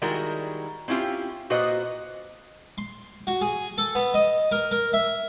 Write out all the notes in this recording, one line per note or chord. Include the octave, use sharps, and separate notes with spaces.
D#3 G3 G#3 E4 F#4 A#4
C4 C#4 E4 F4 G4
A#2 F#4 B4 C5 D#5
C6
F#4
G#4
A4
B3
D#5
A#4
A#4
E5